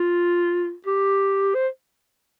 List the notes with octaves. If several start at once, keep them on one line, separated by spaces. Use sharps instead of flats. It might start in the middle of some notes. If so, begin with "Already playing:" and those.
Already playing: F4
G4
C5